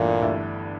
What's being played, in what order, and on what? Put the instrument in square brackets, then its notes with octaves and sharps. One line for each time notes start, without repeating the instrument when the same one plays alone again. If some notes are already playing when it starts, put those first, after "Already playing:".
Already playing: [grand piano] G1 G2 E3 A3 [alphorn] A#2
[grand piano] G1 G2 E3 A3